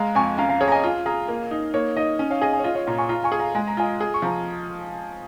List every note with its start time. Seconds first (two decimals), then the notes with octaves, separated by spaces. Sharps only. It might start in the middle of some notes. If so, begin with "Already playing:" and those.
Already playing: G#3 F5 A#5
0.15 F2 G#5 C#6
0.38 C#4 F5 A#5
0.49 F5 A#5
0.60 G#4 C#5 F5
0.68 A#5
0.72 D#5 G#5
0.84 F4
1.06 G#4 F5 A#5
1.28 A#3
1.51 D#4
1.74 A#3 C#5
1.96 D#4 D#5
2.19 C#4
2.30 C#5 F5
2.41 G#4 D#5 G#5
2.53 D#5 G#5
2.59 C#5
2.64 F4 D#5
2.75 C#5 F5
2.87 A#2 F5 A#5
2.98 G#5 C#6
3.09 F4 F5 A#5
3.24 G#5 C#6
3.32 G#4
3.39 F5 A#5
3.55 G#3 G#5
3.67 A#5
3.77 F4 D#5 G#5
4.01 G#4
4.14 C#6
4.22 F3 A#5